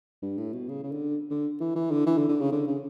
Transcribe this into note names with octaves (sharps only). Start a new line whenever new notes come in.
G2
A2
B2
C#3
C#3
D3
D3
E3
E3
D3
E3
D3
D3
C#3
D3
C#3